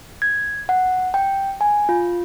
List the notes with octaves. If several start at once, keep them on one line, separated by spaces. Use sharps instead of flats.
G#6
F#5
G5
G#5
F4